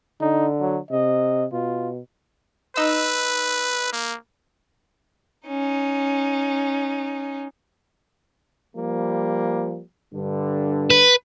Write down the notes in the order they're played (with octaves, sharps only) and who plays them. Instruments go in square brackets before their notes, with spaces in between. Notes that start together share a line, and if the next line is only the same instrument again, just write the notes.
[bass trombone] D3 [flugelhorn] D#4
[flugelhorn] F#3
[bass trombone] C3 [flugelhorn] D#5
[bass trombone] B2 [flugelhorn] F4
[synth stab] D#4 D#5 E6 [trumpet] B4
[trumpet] A#3
[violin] C#4 D#4
[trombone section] F3 G3 A#3
G2 D3
[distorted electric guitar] B4